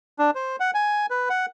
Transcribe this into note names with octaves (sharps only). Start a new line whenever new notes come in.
D4
C5
F#5
G#5
B4
F#5